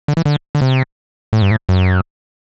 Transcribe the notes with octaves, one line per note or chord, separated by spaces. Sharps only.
D3
E3
D3
D3
C3
A2
G2
A2
F#2